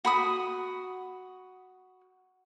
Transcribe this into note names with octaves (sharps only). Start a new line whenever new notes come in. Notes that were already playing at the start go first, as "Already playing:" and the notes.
F#4 B5 D#6